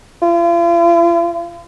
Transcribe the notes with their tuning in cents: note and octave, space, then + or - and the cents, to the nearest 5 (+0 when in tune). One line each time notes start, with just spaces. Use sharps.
F4 -45